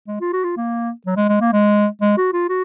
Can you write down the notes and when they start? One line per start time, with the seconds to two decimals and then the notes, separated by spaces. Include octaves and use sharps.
0.08 G#3
0.21 F4
0.33 F#4
0.44 F4
0.57 A#3
1.06 F#3
1.17 G#3
1.28 G#3
1.41 A#3
1.53 G#3
2.01 G#3
2.17 F#4
2.33 F4
2.49 F#4